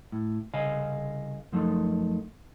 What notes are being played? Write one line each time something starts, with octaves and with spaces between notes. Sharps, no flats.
A2
C2 C#3 D#5 F5 G#5
F#2 F3 A3 D#4